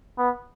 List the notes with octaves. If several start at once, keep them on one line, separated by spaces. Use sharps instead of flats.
B3